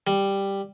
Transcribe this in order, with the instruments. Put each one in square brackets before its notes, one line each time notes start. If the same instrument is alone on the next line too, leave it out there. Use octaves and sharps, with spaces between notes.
[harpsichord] G3